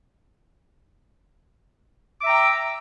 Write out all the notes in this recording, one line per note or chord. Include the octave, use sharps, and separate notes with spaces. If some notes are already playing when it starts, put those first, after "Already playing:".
E5 G5 A#5 D6 E6